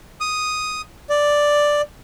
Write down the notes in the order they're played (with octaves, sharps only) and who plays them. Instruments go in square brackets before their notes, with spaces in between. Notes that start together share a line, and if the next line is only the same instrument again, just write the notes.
[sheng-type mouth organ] D#6
D5